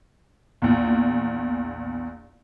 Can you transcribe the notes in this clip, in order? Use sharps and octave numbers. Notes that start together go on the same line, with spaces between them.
A#1 E2